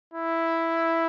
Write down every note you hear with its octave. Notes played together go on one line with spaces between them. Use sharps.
E4